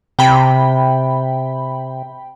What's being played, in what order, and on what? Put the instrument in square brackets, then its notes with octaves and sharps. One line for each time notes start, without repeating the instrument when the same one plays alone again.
[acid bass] C3 [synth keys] G5 B5